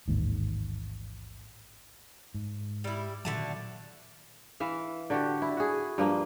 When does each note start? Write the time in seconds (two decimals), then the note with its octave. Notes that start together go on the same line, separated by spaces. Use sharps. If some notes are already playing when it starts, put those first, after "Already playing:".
0.08 A1 D#2 G#2
2.34 G#2
2.84 G3 E4
3.25 A#2 D3 D#3 F#3 A3 A5
4.60 E3 E5 F5
5.10 D3 F#4 G4
5.42 E4
5.57 F#4 G#4
5.98 G2 F3 A#3